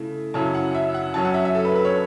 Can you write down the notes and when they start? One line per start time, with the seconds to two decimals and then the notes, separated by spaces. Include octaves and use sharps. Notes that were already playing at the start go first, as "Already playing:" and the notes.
Already playing: C#3 A3 E4
0.34 F#2 C#3 F#3 C#4 E4 A5
0.55 F#5
0.75 E5
0.94 F#5
1.14 F#2 F#3 C#4 A5
1.25 F#5
1.34 E5
1.45 E5
1.55 A4
1.65 B4
1.75 B4
1.85 C#5